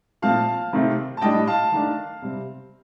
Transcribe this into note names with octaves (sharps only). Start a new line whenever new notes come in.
A#2 F3 A3 C4 F5 A5
C3 D#3 A3 C4
A5
A2 G3 D4 D#5 G5
F5 A5
D#3 A3 D4
C3 G3 C4